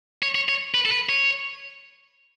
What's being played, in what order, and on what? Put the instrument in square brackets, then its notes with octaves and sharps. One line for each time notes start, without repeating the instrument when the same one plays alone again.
[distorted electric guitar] C#5
C#5
C#5
B4
A4
B4
C#5